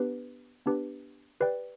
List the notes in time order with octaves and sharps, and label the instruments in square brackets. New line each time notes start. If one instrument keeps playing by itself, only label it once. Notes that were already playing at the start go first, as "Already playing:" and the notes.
Already playing: [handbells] B3 D4 G4 B4
B3 D4 G4 B4
G4 B4 D5 G5